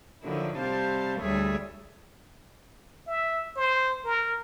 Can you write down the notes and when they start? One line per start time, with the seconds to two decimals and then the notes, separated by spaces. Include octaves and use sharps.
0.24 D3 D#3 F3 F#3 E4
0.57 C3 G3 C5 F5 A5
1.19 D2 G3 A3 G#4 C#5 E5
3.07 E5
3.56 C5
4.05 A#4